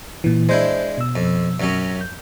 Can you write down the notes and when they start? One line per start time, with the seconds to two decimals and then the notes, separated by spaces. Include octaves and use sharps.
0.24 A#2 E3
0.49 G#3 D4 E4 C5 G6
0.98 B2 E6
1.16 F2
1.60 F#2 F#3 C#4
2.01 G6